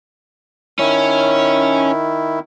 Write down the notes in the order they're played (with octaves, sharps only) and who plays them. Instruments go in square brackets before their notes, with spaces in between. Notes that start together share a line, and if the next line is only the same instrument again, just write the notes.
[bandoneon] D#3 E4 [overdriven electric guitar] C#4